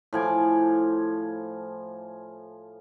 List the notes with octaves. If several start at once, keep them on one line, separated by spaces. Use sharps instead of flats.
A2 F3 G#5 D6